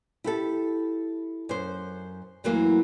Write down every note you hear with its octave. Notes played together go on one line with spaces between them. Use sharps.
E4 G4 A4
F#2 C5
F#2 E3 F#3 A3 A#3